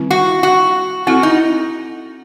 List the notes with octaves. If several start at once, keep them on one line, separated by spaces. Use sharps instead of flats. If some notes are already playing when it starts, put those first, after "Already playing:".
Already playing: D#3 G3 C4 E4
F#4
F#4
C4 E4 F#4 A4
D#4